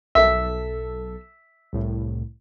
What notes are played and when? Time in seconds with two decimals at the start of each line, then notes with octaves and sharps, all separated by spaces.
0.15 B1 A4 E5
1.73 C2 A2